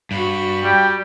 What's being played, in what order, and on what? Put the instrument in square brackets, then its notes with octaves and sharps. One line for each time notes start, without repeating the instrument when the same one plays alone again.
[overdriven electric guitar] G2 [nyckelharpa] F#4 B5
[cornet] G3 [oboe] G5